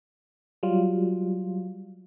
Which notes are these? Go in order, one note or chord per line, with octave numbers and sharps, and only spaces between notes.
F#3 G3 F4